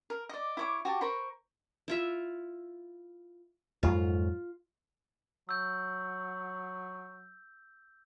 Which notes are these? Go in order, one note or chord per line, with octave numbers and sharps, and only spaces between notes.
A#4
D5 D#5
E4 C#5 D6
F#4 G4 A5
A#4 C5 B5 C#6
E4 F4 E5
F2 G#2 F#3 F4
F#3 E6 G6